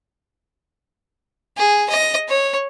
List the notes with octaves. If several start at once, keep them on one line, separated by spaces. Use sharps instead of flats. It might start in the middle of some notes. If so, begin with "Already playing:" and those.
G#4
D#5
C#5